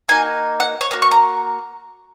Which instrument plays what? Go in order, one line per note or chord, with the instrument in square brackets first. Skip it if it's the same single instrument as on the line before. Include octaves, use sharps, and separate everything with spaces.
[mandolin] A#3 D#4 F#4 G#5
F#5
C#5
A#3 F#4 C#5
C#6
A#5